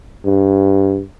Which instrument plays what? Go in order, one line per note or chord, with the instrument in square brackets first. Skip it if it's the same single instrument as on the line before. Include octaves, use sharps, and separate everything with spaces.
[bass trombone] G2